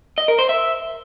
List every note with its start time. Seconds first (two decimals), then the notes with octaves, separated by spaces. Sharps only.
0.18 D#5
0.28 A#4
0.39 C5
0.49 E5